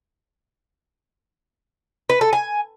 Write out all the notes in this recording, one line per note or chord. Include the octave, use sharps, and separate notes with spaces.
B4
A4
G#5